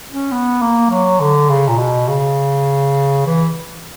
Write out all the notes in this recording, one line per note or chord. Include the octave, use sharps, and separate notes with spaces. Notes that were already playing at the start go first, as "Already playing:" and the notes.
C#4
B3
A#3
F#3
D3
C#3
A#2
B2
C#3
E3